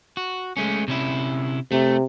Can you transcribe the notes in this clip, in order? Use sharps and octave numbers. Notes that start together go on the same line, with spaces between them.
F#4
G#3 A3 C#4
C3 C#4 E4
C3 A3